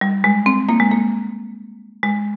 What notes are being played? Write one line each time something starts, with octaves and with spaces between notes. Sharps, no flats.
G3
G#3
C4
A#3
G#3
A#3
G#3